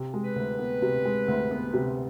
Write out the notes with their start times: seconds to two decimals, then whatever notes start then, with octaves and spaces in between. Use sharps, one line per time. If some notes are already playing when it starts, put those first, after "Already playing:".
Already playing: C3
0.14 G#3
0.24 B4
0.36 D2
0.59 B3
0.82 C3
1.05 G#3
1.28 D2
1.51 B3
1.74 C3